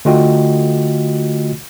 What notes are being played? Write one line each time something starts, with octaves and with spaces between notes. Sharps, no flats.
D3 A3 F4 F#4 D#5 G5